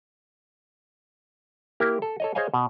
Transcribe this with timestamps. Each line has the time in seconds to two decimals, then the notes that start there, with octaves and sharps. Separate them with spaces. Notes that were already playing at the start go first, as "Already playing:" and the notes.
1.80 A#3 E4 G4 A#4
2.02 A4
2.20 A4 C#5 D#5
2.35 G#4 C5 C#5 D#5 F5 G#5
2.54 B2